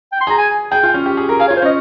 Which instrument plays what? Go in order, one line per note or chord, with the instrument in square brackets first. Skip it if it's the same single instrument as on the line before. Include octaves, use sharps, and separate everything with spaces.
[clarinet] G5
C6
[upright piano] G#4 [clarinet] A#5
[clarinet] G#5
[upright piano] G#4 [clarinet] G5
[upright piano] F4
C#4
G4
G#4
A#4
[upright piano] G#4 [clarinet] F5
[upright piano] F4 [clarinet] C#5
[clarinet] C5
[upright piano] C#4
[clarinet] D#5